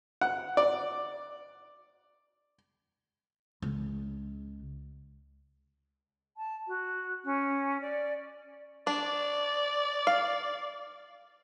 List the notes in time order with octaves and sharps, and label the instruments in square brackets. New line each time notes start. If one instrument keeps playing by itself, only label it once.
[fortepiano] F#5
D5
[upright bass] C#2
[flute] A5
F#4
C#4
D5
[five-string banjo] D4 [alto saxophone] D5
[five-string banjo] F5